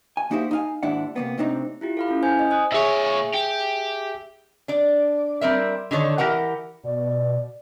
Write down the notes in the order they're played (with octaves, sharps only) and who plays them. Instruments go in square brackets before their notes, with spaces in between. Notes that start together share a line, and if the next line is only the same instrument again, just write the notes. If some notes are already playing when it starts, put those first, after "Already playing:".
[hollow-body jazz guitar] G#5
A#3 D#4 E4 F#4 G4 C5
D#4 F5 G#5
D#2 G#2 D4 E4 F#5
C3 A#3 B3
A2 C3 C4 D4 D#4
[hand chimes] E4 F4 G4
A4 F5 B5
C#4 E4
C5 G#5 G6
D#5
G#5 D#6 F#6
[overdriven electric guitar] A#2 C#5 [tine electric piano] G#4 E5
[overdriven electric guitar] G4
[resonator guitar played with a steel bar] D4 D5
G3 C4 A#4 E5
D3 D#3 A4 C#5
E3 G4 A#4 F#5
[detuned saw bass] B2 [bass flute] D5